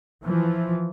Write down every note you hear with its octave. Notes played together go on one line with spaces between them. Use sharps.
E3 F3